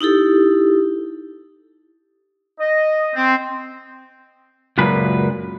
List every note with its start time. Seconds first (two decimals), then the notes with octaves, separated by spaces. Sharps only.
0.01 D#4 E4 G4 A4
2.60 D#5
3.15 C4
4.78 C#2 F#2 A#2 B4